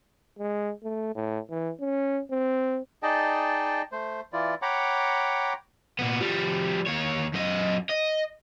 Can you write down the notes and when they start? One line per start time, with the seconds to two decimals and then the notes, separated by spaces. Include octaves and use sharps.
0.39 G#3
0.84 A3
1.15 A2
1.50 E3
1.80 C#4
2.31 C4
3.03 D#4 G#4 D5 D#5 G5 A5
3.92 A3 C5
4.33 E3 E4 F4 D5
4.62 C#5 F#5 G5 A#5 B5 D6
5.99 A#2 B3
6.21 F3 G3
6.87 D#2 C#5
7.34 F#2 D#5
7.89 D#5